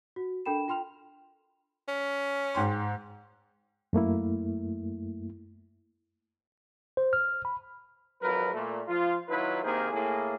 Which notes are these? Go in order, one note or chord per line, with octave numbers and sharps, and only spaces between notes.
F#4
D4 A4 A#4 G5 B5 E7
F4 G5 C6 F6 F7
C#4
G#2 G5 C6
F#2 A3 A#3 E4
C5
F6
B5
G#1 F2 F#3 A#4 B4
A#2 A3
F3 F4
D#3 F#3 E4 F4 B4
C3 D#3 A#3 G#4 A#4 C5
A2 A#3 G#4